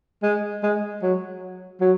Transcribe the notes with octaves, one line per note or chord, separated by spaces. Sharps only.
G#3
G#3
F#3
F#3